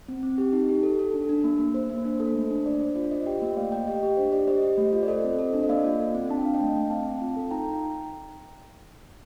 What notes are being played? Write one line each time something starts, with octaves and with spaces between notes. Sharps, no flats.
C4
C4
G4
D#4
G4
A4
A4
D4
D4
A#3
A#3
A#3 C5
A#3
C5
D4
A4
A3
D4
D4 D5
D4 C5
F4 D5
F4 C5 D#5
G4 D#5 G5
A#3
G5
A3 D5 F5
A3 D#5 G5
G4 D#5 G5
G4
D4 C5
G4 D5
G4 C5 D#5
G4
A3
F4
D5
A4 C5 D#5
C4
A4
D4
D#5
A#3 D5 F5
F4
A4
C4
D4 A5
G5
D4 F5
D#5 G5
A3
A3
C4 F5 A5
C4
F4
A4
D#4 G5 A#5